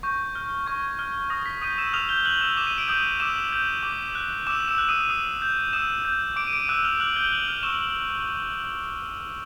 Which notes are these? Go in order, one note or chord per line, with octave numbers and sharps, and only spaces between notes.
C#6 G6
F6
C#6 G#6
F6
D#6 A#6
B6
D#6 G6 D#7
E6 E7
D#6 F6 F7
G6 G7
F#6 G6 F#7
E6 E7
D6 E7
D#7
D7
D#6 G6 D#7
D6 E6 E7
G6
D6
F#6
D6 E6 E7
E6 E7
F#6
D#6 D#7
D#6
G6
D#6 E6 E7
G6
D6 D7
D#7
D6 D7
E6 F#6 E7
F6 F7
D6 F#6 F#7
G6 G7
F#6 F#7
F6 F7
C#6 E6 E7